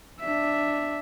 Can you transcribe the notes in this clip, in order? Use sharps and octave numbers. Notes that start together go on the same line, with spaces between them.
D4 E5